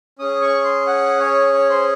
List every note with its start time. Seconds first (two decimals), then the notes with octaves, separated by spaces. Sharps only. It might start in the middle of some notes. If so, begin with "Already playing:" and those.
0.19 C#4 G#4 D#6
0.41 C#6
0.64 C6
0.87 F#5
1.20 C#5
1.53 C#5
1.70 C5